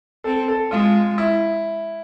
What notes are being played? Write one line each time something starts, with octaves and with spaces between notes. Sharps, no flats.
C4 A4
A4
G#3 F4
E4